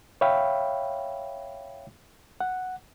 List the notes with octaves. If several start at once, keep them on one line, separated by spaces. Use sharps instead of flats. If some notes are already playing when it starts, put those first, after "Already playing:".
C#5 E5 F5 G5 B5
F#5